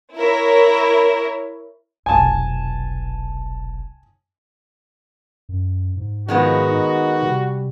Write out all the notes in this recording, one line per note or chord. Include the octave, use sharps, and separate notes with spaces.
E4 A#4 C#5
F1 B1 G#5 A5
F#2
G#2
D#3 F3 G#3 B3 F#4
D#4
C3 G3